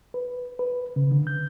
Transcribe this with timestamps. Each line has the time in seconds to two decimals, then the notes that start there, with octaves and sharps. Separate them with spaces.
0.14 B4
0.59 B4
0.96 C#3
1.12 D3
1.27 G6